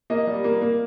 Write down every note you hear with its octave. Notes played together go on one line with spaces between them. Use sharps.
A#3 D#5
G3
A#3
A#3